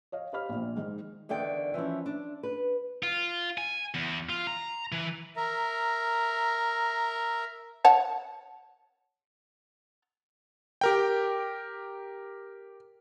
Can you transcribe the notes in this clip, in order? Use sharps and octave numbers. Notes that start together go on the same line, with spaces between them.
C#5 D#5 F5
G4 C5 D#5 F5 B5 F6
A#1 A#2
G#2 D#3
E2 D3 D#3 D5 G5
E3 F3 C#4 E4
D4
B4
F4
G#5
E2
F4
A#5
E3
A#4 E5 A#5
C#5 F#5 A5
G4 A#4 G5